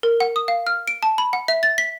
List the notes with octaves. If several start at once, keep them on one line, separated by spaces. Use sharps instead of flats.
A#4
F#5
D#6
F5
F6
D7
A5
B5
F#5
E5
A6
B6